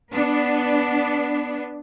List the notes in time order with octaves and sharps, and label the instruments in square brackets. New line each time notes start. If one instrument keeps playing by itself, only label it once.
[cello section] B3 D4